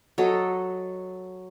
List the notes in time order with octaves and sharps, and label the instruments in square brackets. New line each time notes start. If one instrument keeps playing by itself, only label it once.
[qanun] F#3 A4 D#5